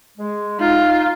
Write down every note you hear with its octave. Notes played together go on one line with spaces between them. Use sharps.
G#3
D#4 F4